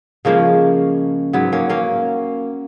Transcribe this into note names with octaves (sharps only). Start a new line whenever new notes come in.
C#3 F3 G#3 A#3 C#4
G#2 F#3 B3
A#3 C#4
A#3 C#4